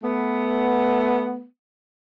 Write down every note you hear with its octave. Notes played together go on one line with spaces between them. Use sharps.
A3 B3